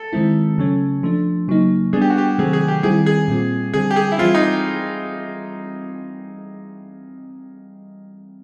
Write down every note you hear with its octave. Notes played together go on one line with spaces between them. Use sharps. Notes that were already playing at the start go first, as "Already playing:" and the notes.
Already playing: A4
D#3 G#3 C4 E4
C#3 F#3 A3 C#4
F3 A3 D4
C#3 F#3 A#3 D#4
G3 B3 D4 G#4
G4
F#4
G4
C3 D#3 F#3 A3 C4 G#4
G#4
G4
D#3 G3 C4 E4 G4 G#4
G#4
A#2 G3 C4 F4
D3 G3 C4 G#4
G4
G#4
E4
E3 G3 C4 F4
D#4